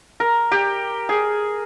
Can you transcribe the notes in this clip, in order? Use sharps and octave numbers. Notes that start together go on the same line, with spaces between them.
A#4
G4
G#4